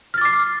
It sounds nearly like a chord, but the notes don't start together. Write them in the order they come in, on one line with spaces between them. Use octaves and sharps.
F6 A6 D6 C7